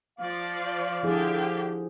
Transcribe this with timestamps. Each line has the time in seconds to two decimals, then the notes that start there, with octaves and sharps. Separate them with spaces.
0.19 F3 D5 F5
1.03 D3 F3 E4 G4 G#4